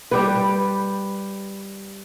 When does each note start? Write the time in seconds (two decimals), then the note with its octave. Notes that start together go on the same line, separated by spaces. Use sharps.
0.11 G3 G4 B4